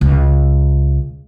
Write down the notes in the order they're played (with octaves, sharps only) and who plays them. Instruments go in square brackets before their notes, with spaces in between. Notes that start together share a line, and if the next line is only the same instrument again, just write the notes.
[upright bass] C#2